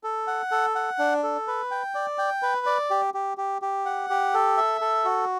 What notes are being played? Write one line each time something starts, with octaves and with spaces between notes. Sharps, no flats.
A4
F#5
A4
F#5
D4
A4
B4
G5
D5
G5
B4
D5
G4
G4
G4
G4
F#5
G4
A4
E5
A4
F#4